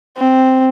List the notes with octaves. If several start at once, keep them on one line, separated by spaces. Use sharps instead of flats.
C4